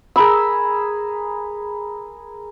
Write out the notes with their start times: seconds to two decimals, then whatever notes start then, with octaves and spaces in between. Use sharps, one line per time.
0.16 G#4 A#4 B5 E6